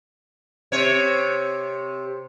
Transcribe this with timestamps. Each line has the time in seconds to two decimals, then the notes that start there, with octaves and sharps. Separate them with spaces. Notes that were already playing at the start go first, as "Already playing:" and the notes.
0.72 C3 C#5